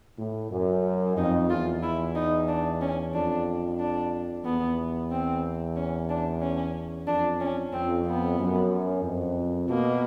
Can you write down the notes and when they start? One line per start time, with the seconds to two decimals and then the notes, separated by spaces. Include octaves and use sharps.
0.19 A2
0.52 F#2
1.17 F2 D#4
1.50 E2 F4
1.83 E4
2.15 D#4
2.48 D4
2.81 C#4
3.13 F2 D4
3.79 D4
4.45 E2 B3
5.11 C4
5.76 C#4
6.09 D4
6.42 C#4
7.07 F2 D4
7.41 C#4
7.72 F2 C4
8.06 B3
8.38 F#2
9.04 F2
9.69 B2 A#3